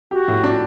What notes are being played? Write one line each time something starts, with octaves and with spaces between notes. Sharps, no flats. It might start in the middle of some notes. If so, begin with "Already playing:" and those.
F#4 G4
A2
D4